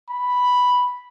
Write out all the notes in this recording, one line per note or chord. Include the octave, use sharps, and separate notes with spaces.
B5